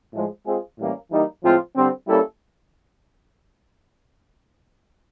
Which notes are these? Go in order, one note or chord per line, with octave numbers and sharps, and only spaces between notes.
A2 F3 G#3
G#3 C4 F4 G#4
A2 E3 G3 A#3 C#4
E3 G3 A#3 D#4
A2 F3 G#3 C4 F4
D3 G3 C4
G3 A#3 C#4 E4 A4